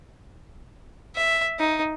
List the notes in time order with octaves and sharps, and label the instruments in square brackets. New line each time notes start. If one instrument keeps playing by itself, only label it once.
[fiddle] E5
D#4